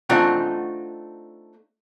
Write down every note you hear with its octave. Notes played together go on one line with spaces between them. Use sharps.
A3 C4 D4 D#4 F4 F#5